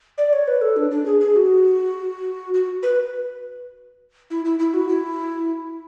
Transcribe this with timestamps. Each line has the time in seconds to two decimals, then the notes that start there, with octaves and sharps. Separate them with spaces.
0.18 D5
0.33 C#5
0.47 B4
0.61 A4
0.76 D4
0.91 D4
1.06 G#4
1.21 G#4
1.36 F#4
2.54 F#4
2.83 B4
4.30 E4
4.45 E4
4.59 E4
4.74 F#4
4.89 E4